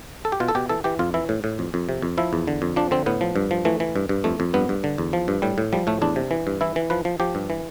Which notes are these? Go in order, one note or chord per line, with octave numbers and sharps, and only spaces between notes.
A4
G4
B2 F4
A4
B2 G4
E3 A4
E3 G4
F2 F4
E3 E4
A2
A2
F2
F2
C3
F2
F3 E4
E2
D3
F2
F3 D4
D3 C4
A2 B3
F3
G2
F3
E3 A3
E3
G2
G2
F2 A3
F2
G2 B3
G2
D3
E2
F3
G2
A2 G3
A2
F3 G3
A2 A3
E2 D4
C3
E3
G2
E3 E4
E3
F3 B4
F3
F3 G4
G2
E3